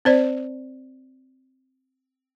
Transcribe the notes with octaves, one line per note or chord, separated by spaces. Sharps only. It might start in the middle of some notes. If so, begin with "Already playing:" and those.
C4 C5 D5